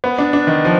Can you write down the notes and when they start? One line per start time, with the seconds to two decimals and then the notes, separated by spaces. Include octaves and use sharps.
0.04 B3
0.18 D4
0.33 D4
0.47 D#3
0.65 F3